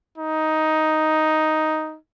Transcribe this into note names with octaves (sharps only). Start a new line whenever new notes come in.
D#4